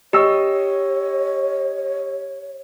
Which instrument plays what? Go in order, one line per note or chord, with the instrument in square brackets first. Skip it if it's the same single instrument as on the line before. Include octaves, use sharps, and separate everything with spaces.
[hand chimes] G4 [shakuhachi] C#5 [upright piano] D#5 C#6 E6